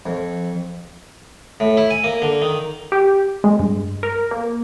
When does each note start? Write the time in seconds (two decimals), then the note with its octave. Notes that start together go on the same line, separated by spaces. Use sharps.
0.06 F2
1.60 A2
1.77 E4
1.91 G#5
2.04 A#3
2.22 D3
2.42 D#3
2.92 G4
3.44 G#3
3.59 G2
4.03 A#4
4.31 A#3